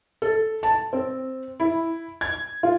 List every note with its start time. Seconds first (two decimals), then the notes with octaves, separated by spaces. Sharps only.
0.22 A4
0.63 A5
0.93 C4
1.60 E4
2.21 G#6
2.63 F4